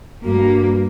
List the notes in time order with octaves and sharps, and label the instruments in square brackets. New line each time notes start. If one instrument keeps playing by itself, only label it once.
[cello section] G2 A#3 [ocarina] F#4